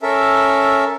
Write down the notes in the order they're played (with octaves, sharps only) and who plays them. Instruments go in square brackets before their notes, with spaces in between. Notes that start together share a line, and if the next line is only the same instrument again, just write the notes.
[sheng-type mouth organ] C#4 A4 A#4 E5